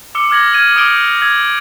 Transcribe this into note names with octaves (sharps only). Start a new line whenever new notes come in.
D6 E6 C#7 G7
D6 F6 G#6 A#6 F#7
F6 G#6 D#7 F#7
D6 D#6 G6 D7 F#7 G7
E6 G#6 F#7